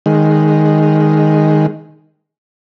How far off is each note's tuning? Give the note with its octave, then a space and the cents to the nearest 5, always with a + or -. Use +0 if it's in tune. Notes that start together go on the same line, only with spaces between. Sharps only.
D#3 +0 G#3 +0